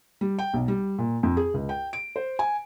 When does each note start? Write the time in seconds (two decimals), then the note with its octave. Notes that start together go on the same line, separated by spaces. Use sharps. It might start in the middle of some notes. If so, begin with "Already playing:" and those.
0.21 G3
0.39 G5
0.54 B1
0.68 G3
0.98 A#2
1.23 F2
1.37 G#4
1.54 C#2
1.69 G5
1.93 D7
2.16 C5
2.39 G#5